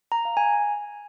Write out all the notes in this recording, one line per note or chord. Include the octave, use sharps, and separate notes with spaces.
A#5
F5
G#5